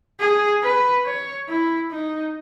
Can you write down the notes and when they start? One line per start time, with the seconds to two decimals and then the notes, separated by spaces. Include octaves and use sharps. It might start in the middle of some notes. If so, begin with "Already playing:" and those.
0.20 G#4
0.63 B4
1.05 C#5
1.49 E4
1.91 D#4